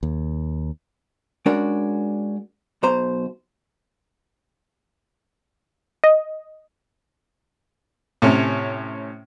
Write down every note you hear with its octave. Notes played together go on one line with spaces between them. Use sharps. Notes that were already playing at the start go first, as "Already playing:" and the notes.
D#2
G#3 C#4 D4 F#4 A#4 D5
B1 B2 C5 A#5
D#5
A2 C3 C#4